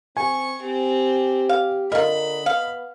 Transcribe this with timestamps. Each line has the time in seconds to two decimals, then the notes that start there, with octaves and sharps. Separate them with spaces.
0.17 C4 G#5 C#6
0.62 C4 G4
1.49 F5
1.92 D3 F4 A#4 D#5 B5
2.46 B3 F5